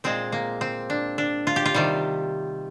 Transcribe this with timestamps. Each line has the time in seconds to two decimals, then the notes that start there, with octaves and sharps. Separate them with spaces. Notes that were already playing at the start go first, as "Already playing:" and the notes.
0.04 A#2 G#3 C4
0.32 A#3
0.61 C4
0.90 D4
1.18 D4
1.47 F4
1.56 G4
1.66 F4
1.74 C3 D#3 G3